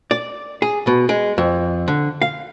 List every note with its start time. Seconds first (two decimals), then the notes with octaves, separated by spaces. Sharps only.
0.11 D5
0.62 G#4
0.87 B2
1.09 G#3
1.38 F2
1.88 D3
2.22 F5